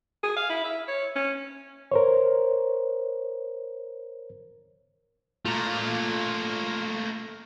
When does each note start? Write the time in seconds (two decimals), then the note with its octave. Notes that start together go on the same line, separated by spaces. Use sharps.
0.23 G#4
0.37 F5
0.50 E4
0.64 E5
0.88 C#5
1.16 C#4
1.92 A#4 C5 C#5
5.45 A3 A#3 F4 A#5